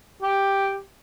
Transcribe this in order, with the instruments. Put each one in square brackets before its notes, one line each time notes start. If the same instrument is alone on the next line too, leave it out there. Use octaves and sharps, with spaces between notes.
[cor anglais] G4